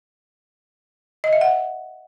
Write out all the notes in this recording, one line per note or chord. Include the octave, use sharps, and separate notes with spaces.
D#5
E5
F#5